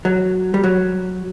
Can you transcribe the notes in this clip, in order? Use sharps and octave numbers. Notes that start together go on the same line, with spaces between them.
F#3
G3
F#3